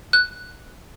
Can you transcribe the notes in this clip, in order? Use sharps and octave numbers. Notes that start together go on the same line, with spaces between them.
F#6